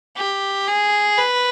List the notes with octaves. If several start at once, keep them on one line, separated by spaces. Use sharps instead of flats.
G4
G#4
B4